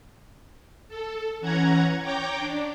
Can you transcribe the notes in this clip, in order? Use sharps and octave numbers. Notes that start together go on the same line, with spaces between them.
A4
E3 C#4 F#5 A#5 G#6
C#5 G5 A#5 D6 G6
D4